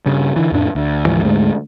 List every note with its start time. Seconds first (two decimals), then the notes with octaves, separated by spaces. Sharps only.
0.06 G2 C#3
0.36 D3 E3
0.52 F2 A2 D4
0.75 D2
1.06 D2 G#2 E3 F3
1.24 D2 G#2 G#3 A3